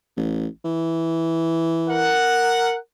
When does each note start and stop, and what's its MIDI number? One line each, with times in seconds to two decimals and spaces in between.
0.17 0.47 33
0.64 2.17 52
1.89 2.76 70
1.89 2.76 78